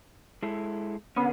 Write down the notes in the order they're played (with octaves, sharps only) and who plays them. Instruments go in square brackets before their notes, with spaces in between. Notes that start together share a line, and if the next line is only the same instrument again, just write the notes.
[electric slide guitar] G#3 E4 A4
[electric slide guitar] D3 C#4 [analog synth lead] B3